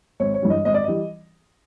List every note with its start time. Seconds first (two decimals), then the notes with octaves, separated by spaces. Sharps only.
0.20 G#1 C#5
0.34 C#5
0.42 G2 E3 G3
0.50 D#5
0.65 G#1 D#5
0.74 D5
0.84 E3 G3 D#5